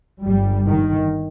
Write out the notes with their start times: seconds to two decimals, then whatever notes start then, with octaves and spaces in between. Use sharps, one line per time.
0.23 G1 G2 G3
0.66 D#3